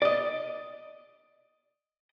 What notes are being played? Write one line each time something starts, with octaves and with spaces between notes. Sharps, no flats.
D5 D#5